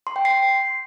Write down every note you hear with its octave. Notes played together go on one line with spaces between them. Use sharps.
C6
G5
C7